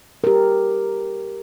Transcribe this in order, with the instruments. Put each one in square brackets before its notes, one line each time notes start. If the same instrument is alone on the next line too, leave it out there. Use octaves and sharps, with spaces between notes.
[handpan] G4 A#4